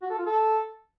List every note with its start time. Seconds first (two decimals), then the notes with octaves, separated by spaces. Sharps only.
0.02 F#4
0.10 A4
0.18 F4
0.26 A4